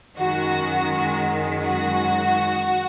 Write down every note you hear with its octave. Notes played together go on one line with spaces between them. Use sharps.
F#2 D#3 G#3 F#4
F#4